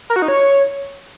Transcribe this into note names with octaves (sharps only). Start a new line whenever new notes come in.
A#4
F#4
D#4
C#5